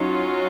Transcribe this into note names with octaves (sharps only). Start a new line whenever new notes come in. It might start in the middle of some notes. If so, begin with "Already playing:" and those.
Already playing: F#3 C#4 D#4 F4